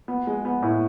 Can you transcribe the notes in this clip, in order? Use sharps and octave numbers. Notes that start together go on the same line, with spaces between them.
B3
G#3
B3
A2